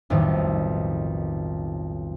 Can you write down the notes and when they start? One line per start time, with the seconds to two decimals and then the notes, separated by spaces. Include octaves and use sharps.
0.10 B1 F2 A2 D#3 G3